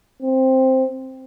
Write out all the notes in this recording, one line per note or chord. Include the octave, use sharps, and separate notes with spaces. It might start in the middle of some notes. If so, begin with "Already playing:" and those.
C4